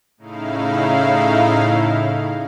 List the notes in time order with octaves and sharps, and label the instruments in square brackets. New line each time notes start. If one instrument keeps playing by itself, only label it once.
[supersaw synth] A2 C#3 D#4 E4 F5